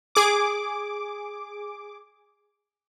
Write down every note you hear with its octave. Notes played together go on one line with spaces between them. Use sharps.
G#4 D6